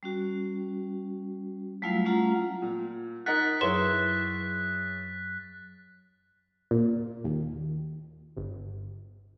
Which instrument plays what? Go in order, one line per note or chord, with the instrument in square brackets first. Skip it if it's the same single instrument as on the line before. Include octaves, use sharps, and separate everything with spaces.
[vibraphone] G3 C#4 F#4
F#3 G3 A3 E4 F4 F5
G3 A3 C#4 F4 F#5 A#5
[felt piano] A#2
[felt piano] D#4 A#4 F#5 [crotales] F#6 A6 B6
[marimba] F#2 F#3 [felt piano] E4 G#4 C#5 [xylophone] B4 C6 E7
[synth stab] A#2
D#2
G1